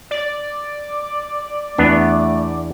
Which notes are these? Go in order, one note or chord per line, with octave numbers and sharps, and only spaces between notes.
D5
E2 A3 B3 D4